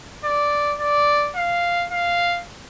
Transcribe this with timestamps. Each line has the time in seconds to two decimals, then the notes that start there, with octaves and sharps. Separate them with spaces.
0.25 D5
0.80 D5
1.36 F5
1.92 F5